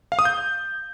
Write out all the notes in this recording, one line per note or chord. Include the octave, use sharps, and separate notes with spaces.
F5
D#6
G6